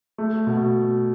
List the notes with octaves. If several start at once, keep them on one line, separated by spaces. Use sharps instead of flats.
A3
B2